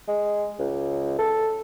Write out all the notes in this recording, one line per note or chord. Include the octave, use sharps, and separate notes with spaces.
G#3
C#2
A4